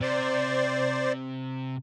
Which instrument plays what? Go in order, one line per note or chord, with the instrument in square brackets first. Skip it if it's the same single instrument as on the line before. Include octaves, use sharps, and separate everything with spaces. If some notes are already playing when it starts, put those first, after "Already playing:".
[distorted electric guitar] C3 [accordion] C5 D5